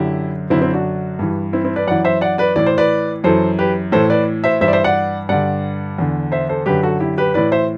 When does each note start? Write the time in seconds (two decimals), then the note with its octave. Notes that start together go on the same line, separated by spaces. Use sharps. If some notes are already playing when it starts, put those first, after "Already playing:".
Already playing: F#2 D3 E4 G4
0.50 F#2 D3 C4 E4
0.62 C4 E4
0.73 D4 F#4
1.19 G2 E3
1.53 C4 E4
1.64 C4 E4
1.76 B4 D5
1.87 F#2 E3 D5 F#5
2.05 C5 E5
2.21 D5 F#5
2.38 B4 D5
2.56 A2 E3 D5
2.66 C5
2.78 B4 D5
3.24 F#2 E3 A4 C5
3.59 G4 B4
3.92 A2 E3 A4 C5
4.10 B4 D5
4.44 C5 E5
4.61 G2 C5 E5
4.64 E3 D5
4.73 C5 E5
4.84 D5 F#5
5.29 G2 D3 D5 F#5
5.98 E2 D3
6.32 C5 E5
6.49 A4 C5
6.66 F#2 D3 G4 B4
6.83 F#4 A4
7.00 E4 G4
7.17 G4 B4
7.34 A2 E3 B4 D5
7.52 C5 E5